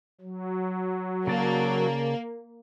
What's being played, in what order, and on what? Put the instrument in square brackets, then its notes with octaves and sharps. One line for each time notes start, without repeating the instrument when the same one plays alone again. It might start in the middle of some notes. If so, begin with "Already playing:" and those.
[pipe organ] F#3
[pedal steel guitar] C#3 D5 A5 [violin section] A#3